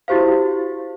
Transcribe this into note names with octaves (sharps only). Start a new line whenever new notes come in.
E4 F#4 G4 C5 F5